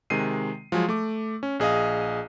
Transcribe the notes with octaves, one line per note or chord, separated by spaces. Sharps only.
C3 D#3 G#3 C7 D#7
F3 F#3 G#3 G#4
A3 D6
C#4
A#1 G#4 D#5 F5 D#6